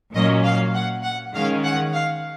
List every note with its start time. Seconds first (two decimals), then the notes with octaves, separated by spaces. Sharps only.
0.14 A#2 F#3 A#3 C#4 D#5
0.45 F5
0.74 F#5
1.04 F#5
1.35 D#3 G#3 C#4 F5
1.65 F#5
1.95 F5